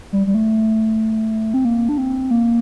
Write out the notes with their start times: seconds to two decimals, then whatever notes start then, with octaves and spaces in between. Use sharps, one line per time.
0.13 G3
0.27 G3
0.34 A3
1.54 C4
1.65 A#3
1.89 D4
1.98 C4
2.31 A#3